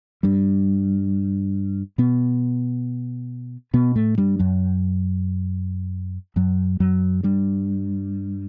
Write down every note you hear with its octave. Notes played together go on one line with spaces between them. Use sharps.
G2 G3
B2 B3
B2 B3
A2 A3
G2 G3
F#2 F#3
F#2 F#3
F#2 F#3
G2 G3